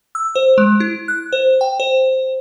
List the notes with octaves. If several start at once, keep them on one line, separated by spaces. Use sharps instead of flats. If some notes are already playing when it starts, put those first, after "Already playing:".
E6
C5
G#3
E4
F#6
C5
G5
C5